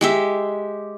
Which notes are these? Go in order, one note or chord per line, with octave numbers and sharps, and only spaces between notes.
G#3 G4 E5